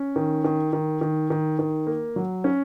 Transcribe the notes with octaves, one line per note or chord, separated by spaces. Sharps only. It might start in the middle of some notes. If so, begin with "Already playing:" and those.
Already playing: C#4
D#3
D#3
D#3
D#3
D#3
D#3
A#3
F#3
C#4